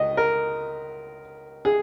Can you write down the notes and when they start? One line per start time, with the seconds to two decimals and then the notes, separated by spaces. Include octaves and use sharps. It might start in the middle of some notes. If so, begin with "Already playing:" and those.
Already playing: C#2 D#5
0.17 A#4
1.65 G#4